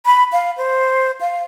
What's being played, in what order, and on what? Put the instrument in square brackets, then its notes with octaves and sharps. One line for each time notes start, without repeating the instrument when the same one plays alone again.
[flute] B5
F5
C5
F5